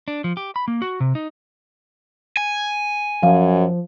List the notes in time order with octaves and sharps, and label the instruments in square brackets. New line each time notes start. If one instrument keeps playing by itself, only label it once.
[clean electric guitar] D4
F3
G4
B5
A#3
F#4
C3
D#4
[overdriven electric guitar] G#5
[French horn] F#2 [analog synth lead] F3 [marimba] F5